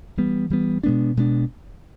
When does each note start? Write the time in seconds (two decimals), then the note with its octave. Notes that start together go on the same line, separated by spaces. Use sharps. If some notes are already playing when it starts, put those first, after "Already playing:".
0.17 E3 G3 B3
0.50 E3 G3 B3
0.83 B2 G#3 B3 D4
1.17 B2 G#3 B3 D4